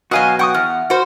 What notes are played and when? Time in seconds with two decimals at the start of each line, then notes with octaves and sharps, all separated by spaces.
0.11 B2 F#3 F#4 D#5 F5 G#5
0.39 F#5 G5 C#6 D#6
0.54 E2 F6
0.90 F#4 C5